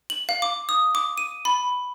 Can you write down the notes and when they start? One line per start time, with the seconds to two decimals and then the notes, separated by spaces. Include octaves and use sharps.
0.10 F#7
0.29 F5
0.42 D6
0.69 D#6
0.95 D6
1.18 D#7
1.45 B5